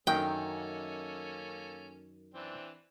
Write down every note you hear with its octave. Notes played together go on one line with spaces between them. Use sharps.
F#2 D#3 A#3 C#4 A4 G5
E3 C4 D4